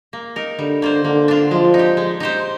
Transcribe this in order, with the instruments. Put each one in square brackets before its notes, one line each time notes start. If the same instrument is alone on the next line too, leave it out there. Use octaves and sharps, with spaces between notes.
[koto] A#3
D#4 A#4
[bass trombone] D3 [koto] G3
[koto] A#3 F4 C5
[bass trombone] D3 [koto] A#3
[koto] D4 F4
[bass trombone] F3 [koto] G#3
[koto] D#4
G4
G#3
D#4 G4 C5